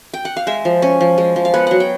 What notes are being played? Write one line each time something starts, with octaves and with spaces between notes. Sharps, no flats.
G5
F#5
F5
G#3 E5
F3
C#4
F3
G#3
F3
F5
B3 F#5
F#3 F#5
G5